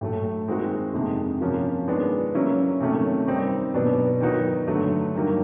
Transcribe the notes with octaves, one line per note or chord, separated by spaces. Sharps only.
A2 F#3 A3
D#3 G#3 C4 D#4 F#4
F2 C3 D#3 G#3
C3 F3 A#3 C#4 F#4
D#3 G#3 B3 D4 F4
C#3 F#3 A#3 C#4 E4
C3 D#3 F#3 A3 C#4
D#3 G3 C4 D#4
B2 F#3 B3 D4
D#3 F#3 B3 D#4 F#4
D3 F#3 A3
G2 D#3 F#3 A#3